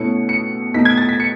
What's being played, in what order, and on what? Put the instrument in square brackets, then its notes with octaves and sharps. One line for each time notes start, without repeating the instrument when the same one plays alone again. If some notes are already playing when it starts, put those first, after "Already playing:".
Already playing: [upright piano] B2 A3 C#4 E4 C#7
C#7
B2 A3 D#4 B6
G#6
A6
B6
C#7